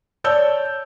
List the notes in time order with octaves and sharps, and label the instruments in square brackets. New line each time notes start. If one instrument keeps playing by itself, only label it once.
[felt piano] C#5 D5 A5 E6 G6